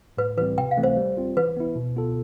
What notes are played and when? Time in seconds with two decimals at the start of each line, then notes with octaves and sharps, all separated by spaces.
0.17 A2 B4
0.37 E3 G3 C4 B4
0.58 C3 G5
0.71 F5
0.77 E3 A3 C4
0.83 C5
0.97 G3
1.17 C4 F4
1.37 E3 B4
1.57 B3 E4
1.76 B2
1.96 B3 F4 A4